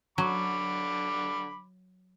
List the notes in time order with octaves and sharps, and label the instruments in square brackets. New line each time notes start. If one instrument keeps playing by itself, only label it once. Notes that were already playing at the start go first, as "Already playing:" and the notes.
[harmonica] D3 B5 D6 [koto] F#3